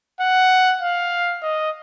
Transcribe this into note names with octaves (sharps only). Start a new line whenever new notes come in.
F#5
F5
D#5